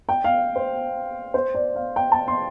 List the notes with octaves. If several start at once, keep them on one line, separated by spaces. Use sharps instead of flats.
G5
F5
C5
C5
D5
F5
G5
A5
C6